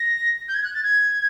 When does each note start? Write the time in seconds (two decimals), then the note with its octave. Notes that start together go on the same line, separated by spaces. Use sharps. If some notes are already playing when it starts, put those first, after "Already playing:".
Already playing: A#6
0.48 G6
0.54 G#6
0.63 F#6
0.73 A6
0.83 G#6